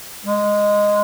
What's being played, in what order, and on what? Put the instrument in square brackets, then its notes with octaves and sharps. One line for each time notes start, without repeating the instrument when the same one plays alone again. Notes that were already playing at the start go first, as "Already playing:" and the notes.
[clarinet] G#3